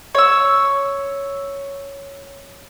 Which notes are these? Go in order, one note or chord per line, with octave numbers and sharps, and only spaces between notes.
C#5 E6